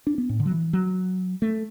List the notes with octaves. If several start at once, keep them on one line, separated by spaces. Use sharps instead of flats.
D4
B3
A2
D3
F#3
E3
F#3
A3